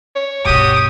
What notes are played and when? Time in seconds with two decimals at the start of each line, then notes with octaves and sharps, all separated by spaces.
0.16 C#5
0.45 G2 B2 F#4 G4 D#6